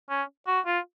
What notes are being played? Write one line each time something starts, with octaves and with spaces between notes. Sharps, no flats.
C#4
F#4
F4